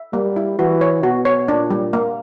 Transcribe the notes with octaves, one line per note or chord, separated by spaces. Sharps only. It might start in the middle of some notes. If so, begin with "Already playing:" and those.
Already playing: E5
G3 A#3
E4
E3 F#4
C#5
B2 F#4
C#5
A#2 D4
G3
A#3